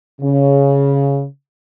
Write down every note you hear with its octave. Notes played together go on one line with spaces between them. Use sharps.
C#3